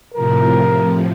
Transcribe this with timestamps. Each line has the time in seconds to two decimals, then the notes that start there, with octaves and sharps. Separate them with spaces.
0.14 A2 C3 F3 A#4